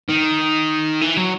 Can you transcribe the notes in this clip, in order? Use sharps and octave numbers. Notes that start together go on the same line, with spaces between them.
D#3
E3
F#3